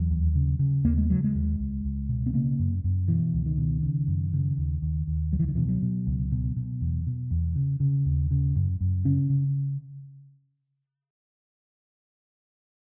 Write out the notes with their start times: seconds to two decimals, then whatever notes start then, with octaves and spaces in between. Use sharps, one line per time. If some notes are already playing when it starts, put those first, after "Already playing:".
Already playing: E2 F#3
0.10 D#2
0.35 C#3
0.59 C#3
0.84 D#2 A#3
0.98 G#3
1.10 C#3 F#3
1.24 G#3
1.35 D#2
1.59 C#2
1.85 C#2
2.09 B2
2.26 B3
2.33 C#3 A#3
2.59 F#2
2.84 F#2
3.08 B2 E3
3.34 C#2
3.46 D#3
3.57 B2
3.82 C#3
4.08 F#2
4.33 C#3
4.58 D#2
4.82 D#2
5.07 D#2
5.31 C#2 F#3
5.40 E3
5.48 D#3
5.55 B2 E3
5.69 F#3
5.82 B2
6.07 C#2
6.32 B2
6.56 B2
6.81 E2
7.07 B2
7.31 E2
7.56 C#3
7.80 C#3
8.05 D#2
8.31 C#3
8.56 F#2
8.81 F#2
9.05 C#3 C#4
9.30 C#3